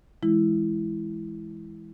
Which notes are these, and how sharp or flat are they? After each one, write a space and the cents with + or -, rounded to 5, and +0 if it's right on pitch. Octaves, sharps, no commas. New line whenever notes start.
E3 +0 G#3 +0 E4 +0